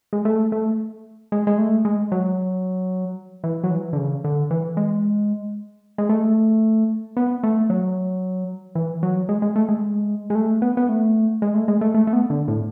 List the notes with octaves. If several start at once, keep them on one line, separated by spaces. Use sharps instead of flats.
G#3
A3
A3
G#3
G#3
A3
G#3
F#3
E3
F#3
E3
D3
C#3
D3
E3
G#3
G#3
A3
B3
A3
F#3
E3
F#3
G#3
G#3
A3
G#3
G#3
A3
B3
B3
A3
G#3
A3
G#3
A3
A3
A3
B3
D3
A2